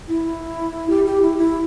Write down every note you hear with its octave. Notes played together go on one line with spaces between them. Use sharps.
E4
G4
G4
E4
E4